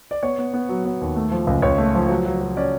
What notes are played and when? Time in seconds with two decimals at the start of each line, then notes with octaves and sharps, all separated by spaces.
0.11 D5
0.23 B3 C#5
0.38 B3
0.53 B3
0.69 F#3
0.85 B3
1.01 D#2
1.16 A3
1.31 F3
1.47 C#2
1.62 C#2 C#5
1.78 A3
1.95 F3
2.09 F#3
2.26 F#3
2.41 F#3
2.57 C#4 D5